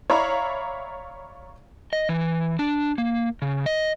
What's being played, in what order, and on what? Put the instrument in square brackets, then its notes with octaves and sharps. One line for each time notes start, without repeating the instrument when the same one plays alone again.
[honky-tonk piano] C#5 D5 E5 F5 A#5 B5
[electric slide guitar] D#5
E3
D4
A#3
C#3
D#5